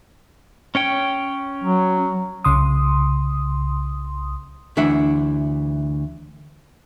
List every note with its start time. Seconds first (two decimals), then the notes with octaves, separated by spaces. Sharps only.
0.75 C#4 C#5 G5
1.64 F#3
2.44 C2 C#3 C6 D#6
4.77 D2 E3 D4 E5 F#5